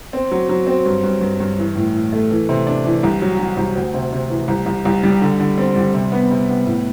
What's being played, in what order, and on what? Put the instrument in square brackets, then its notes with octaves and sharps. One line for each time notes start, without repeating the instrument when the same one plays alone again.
[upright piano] C4
F#3
F#3
C4
G2
G2
G2
G2
E3
A2
A2
A3
E3
C3
D4
E3
C2
F#3
F#3
C2
D2
C3
C3
E3
C2
C2
C2
G3
D3
D3
C4
G3
C3
B3
C3
B3
A2